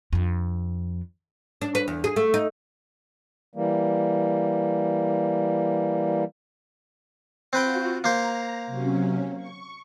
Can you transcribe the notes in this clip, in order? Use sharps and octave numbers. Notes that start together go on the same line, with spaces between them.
F2 D4
D4
B4
E2
G#4
A3
D#4
E3 G3 A#3
C4 F4 F#4 B4 G5
A#3 C5 A#5
C3 F#3 C#4
C#6